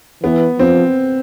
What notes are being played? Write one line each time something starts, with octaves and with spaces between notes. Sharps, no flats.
E3 B3
F3 C4